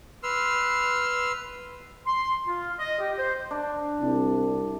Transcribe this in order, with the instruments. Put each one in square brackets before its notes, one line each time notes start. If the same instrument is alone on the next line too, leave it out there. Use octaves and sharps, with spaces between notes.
[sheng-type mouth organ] B4 C6 E6 F6
[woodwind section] C6
F4
D#5
G4
C5
[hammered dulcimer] D4
[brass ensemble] C2